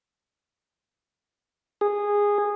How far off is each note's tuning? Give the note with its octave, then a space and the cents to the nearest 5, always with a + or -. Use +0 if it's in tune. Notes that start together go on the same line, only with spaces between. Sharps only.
G#4 -15